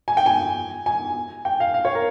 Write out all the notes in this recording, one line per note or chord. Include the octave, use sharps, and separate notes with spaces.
G#5
G5
G#5
G#5
G5
F5
F5
C#5
A#4